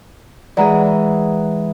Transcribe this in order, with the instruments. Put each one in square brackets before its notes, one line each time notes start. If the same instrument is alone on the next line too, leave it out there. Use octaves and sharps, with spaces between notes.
[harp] E3 G#3 G#4 [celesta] D5 F#5 A#5